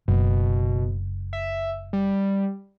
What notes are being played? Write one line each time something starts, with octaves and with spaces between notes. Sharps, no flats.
F#1 B2
E5
G3